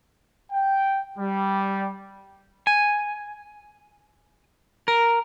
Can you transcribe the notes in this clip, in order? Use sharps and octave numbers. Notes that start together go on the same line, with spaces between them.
G5
G3
G#5
A#4